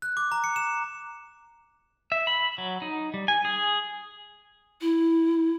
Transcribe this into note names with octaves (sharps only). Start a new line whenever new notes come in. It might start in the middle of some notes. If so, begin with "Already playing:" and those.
F#6
D6
A#5
C#7
E7
E5
B5
F#3
D#4
G3
G#5
G#4
E4